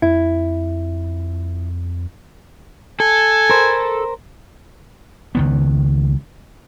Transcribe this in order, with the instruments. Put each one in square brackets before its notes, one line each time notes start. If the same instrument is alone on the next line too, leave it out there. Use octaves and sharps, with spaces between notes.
[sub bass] F2 [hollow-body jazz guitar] E4
[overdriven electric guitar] A4 [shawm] G#5
[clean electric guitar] A#4 C5
[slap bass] C#2 D#3 B3